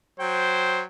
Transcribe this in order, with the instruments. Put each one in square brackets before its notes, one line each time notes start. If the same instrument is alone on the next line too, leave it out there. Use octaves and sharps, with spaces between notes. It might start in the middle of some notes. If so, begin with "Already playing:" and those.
[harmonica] F#3 G5 [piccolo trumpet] C5